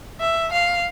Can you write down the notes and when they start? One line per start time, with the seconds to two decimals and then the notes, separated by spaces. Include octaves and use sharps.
0.20 E5
0.52 F5